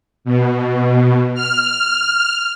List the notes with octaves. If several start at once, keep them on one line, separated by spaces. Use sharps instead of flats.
B2
F6